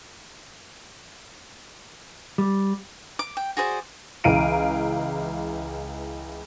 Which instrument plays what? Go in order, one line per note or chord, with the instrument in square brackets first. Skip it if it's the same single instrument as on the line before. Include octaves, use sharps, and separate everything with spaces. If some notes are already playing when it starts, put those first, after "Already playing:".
[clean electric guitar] G3
[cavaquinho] D6
G5
F#4 G#4 C5 D5
[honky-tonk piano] C#2 E3 F5 A#5 D7 D#7